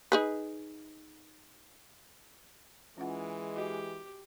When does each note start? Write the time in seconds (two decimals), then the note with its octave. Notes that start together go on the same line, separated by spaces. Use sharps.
0.12 D#4 G#4 B4
2.98 E3 G#3 C#4 F4 F#5
3.56 F#4 G4 D#5